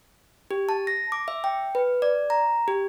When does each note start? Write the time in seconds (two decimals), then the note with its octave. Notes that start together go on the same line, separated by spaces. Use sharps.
0.51 G4
0.69 A5
0.87 A#6
1.12 D6
1.28 E5
1.44 G5
1.75 B4
2.02 D5
2.30 A#5
2.68 G4